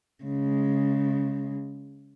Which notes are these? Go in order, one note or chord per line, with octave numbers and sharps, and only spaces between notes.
C#3 G#3